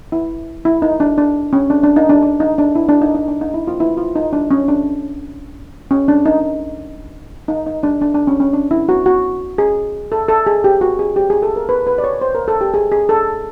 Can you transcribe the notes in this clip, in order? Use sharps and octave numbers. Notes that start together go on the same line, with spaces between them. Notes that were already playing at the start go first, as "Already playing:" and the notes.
E4
E4
D#4
D4
D4
C#4
D4
D4
D#4
D4
D4
D#4
D4
E4
D4
D#4
D#4
D4
D#4
E4
F4
E4
F4
D#4
D4
C#4
D4
C#4
D4
D#4
D#4
D#4
D4
D4
D4
C#4
C#4
D4
E4
F#4
F#4
G#4
A4
A4
G#4
G4
F#4
G#4
G4
G#4
A4
A#4
B4
B4
D5
C#5
C5
A#4
A4
G4
G#4
G#4
A4